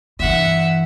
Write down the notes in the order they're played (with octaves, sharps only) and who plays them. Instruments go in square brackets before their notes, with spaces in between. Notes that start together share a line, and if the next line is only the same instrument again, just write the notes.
[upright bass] G2 E3 [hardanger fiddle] E5 F#5